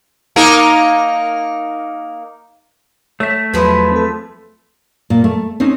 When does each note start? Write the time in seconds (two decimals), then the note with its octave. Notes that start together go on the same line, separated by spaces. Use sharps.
0.36 A#3 D#4 A#4
3.20 A3 C#5 E5
3.53 E2 F3 F#3 G#4 B4
3.92 C4 A4
5.10 A#2
5.24 A3
5.60 C4 C#4 D#4